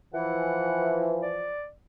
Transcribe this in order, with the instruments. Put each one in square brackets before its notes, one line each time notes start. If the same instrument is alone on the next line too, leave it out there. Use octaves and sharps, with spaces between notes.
[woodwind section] E3 [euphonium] F3 [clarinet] F#5
[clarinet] D5